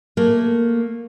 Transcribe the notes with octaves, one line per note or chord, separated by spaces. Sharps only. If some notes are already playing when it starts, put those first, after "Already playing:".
A3 A#3